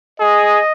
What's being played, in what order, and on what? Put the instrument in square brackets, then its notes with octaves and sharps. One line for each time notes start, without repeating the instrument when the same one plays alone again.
[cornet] G#4 [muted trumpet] D#5